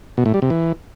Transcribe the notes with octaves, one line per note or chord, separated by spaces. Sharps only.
B2
A2
G3
C3
E3